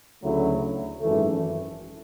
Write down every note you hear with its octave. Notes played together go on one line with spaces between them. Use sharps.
D2 C#3 F#3 A3 E4
G#1 F#2 E3 A3